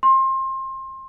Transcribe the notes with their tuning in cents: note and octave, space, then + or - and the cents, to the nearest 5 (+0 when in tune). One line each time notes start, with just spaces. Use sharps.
C6 +25